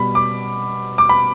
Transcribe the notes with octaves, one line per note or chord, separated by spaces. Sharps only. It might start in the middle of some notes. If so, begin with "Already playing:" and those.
Already playing: B2 G3 B5
D6
D6
B5